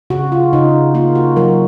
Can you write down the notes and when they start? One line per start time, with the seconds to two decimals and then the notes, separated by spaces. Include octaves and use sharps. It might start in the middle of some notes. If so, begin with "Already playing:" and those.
0.10 C#3 F#4
0.32 F4
0.53 C#3 D#4
0.94 A#3 F4
1.15 F#4
1.36 F#3 A#4